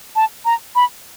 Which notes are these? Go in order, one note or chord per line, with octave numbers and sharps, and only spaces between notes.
A5
A#5
B5